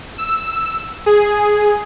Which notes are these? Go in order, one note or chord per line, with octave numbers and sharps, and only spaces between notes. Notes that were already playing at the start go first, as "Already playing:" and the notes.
E6
G#4